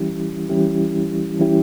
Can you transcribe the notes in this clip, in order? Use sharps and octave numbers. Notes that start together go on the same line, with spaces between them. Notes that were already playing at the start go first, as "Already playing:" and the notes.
Already playing: E3 G3 C#4 E4 G4
E3 G3 C#4 E4 G4
E3 G3 C#4 E4 G4